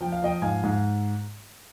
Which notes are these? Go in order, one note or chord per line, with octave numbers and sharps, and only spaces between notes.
F3 G5
F5
F3 D#5 G5
G#2 F5 G#5
G#2